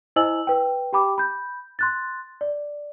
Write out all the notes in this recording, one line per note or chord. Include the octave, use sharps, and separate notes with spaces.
E4 C5 D#5 G#5 E6 F#7
B4 G5
G4 G5 B5 D6
B5 G6
C6 F#6 A6
D5